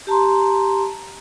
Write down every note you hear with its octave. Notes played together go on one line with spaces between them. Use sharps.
G4 A5 A#5 C6